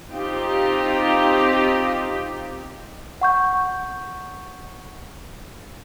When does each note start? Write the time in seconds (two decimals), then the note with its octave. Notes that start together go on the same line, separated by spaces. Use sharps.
0.11 C4 D#4 F4 G4
3.21 F#5 C#6 G6